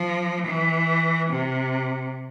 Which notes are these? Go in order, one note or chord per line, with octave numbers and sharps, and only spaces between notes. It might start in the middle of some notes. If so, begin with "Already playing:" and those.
Already playing: F3
E3
C3